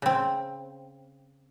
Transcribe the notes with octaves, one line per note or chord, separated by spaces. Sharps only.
C#3 C4